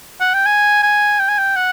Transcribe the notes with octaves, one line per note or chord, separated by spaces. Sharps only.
F#5
G5
G#5
G#5
G5
G#5
G5
F#5